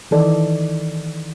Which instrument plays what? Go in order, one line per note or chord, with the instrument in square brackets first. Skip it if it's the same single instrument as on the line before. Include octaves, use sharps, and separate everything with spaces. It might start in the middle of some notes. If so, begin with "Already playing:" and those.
[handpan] D#3 E3 A4 D5 D#5